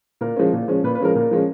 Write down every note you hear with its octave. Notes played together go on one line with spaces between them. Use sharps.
A#2 A#4
F3 G#3 C#4
A#2
F3 G#3 C#4
A#2 B4
B4
F3 G#3 C#4 A#4
A#2 A#4
F3 G#3 C#4